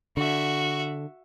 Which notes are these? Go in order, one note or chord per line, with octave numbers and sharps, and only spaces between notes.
D3 F#4 E5